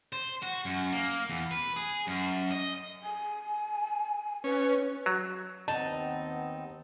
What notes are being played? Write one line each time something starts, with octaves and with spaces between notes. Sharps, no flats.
C5
F#4
F#2
A#3
E2
B4
G#4
F#2
D#5
G#5
C#4 B4
F#3
D#2 B3 C4 D#4 A5